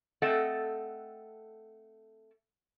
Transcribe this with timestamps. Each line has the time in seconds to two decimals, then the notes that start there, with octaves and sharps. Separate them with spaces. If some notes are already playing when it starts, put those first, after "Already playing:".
0.22 A3 C4 A4 D#5 F#5